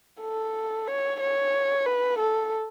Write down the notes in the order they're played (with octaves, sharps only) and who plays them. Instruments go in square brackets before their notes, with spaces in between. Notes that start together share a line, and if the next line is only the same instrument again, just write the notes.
[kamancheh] A4
C#5
C#5
B4
A4